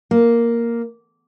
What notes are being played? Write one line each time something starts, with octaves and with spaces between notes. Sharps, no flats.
A#3